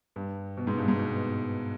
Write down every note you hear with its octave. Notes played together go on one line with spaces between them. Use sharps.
G2
B2
G#2
G2
G#2
B2